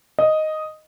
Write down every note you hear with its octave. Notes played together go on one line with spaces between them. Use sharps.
D#5